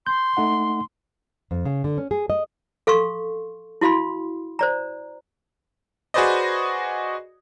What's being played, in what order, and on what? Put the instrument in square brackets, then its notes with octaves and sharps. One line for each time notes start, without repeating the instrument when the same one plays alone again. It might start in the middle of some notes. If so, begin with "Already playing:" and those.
[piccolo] C6 [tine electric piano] G6
[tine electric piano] A3 D#4 F#5
[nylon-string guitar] F2
C#3
D3
C#4
G#4
D#5
[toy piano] A4 F5 C6 C#6
E4 F#4 F5 B5 C6
C5 D5 A#5
[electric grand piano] F#4 G#4 B4 C5 D5 D#5